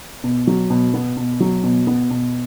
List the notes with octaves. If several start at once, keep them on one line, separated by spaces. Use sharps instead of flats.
B2
F#3
B2
B3
B2
F#3
B2
B3
B2